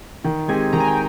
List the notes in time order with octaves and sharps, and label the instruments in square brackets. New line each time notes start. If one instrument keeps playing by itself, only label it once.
[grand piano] D#3
[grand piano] G#3 C4 D#4 G4 [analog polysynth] G#5
[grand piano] D#3 [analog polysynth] A#5
[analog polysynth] G#5
G5